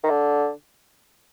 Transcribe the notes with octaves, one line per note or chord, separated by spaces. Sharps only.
D#3
D3